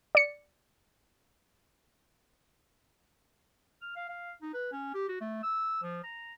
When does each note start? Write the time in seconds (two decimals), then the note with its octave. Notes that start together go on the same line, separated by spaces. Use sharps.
0.15 D5 C#7
3.82 F6
3.96 F5
4.09 F5
4.42 D#4
4.54 B4
4.73 C#4
4.94 G4
5.09 F#4
5.21 A3
5.43 E6
5.83 F3
6.04 A#5